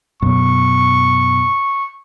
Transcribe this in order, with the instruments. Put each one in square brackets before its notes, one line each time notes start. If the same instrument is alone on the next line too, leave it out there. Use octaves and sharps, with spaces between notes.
[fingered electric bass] F#2 B2 [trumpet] C#6